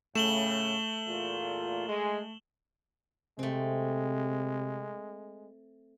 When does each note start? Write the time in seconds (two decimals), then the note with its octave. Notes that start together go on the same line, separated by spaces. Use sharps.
0.15 A2 C#3 A3 E7 F#7 G7
1.07 E2 A#2 F4
1.88 G#3
3.39 C3 G#3 A3 C4